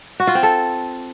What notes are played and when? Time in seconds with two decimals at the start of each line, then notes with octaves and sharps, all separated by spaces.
0.20 F#4
0.27 F4
0.35 C4
0.43 A4